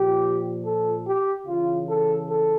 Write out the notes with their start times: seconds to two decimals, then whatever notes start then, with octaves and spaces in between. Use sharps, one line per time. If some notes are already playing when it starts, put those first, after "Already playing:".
Already playing: A#2 F3 G4
0.65 A4
1.05 G4
1.47 C#3 E3 F4
1.87 A4
2.28 A4